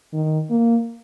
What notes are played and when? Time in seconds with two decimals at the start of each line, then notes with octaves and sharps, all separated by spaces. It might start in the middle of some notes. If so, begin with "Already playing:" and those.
0.13 D#3
0.50 A#3